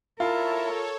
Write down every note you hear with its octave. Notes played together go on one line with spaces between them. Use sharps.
E4 F4 A4 A#4 C#5 E5 A5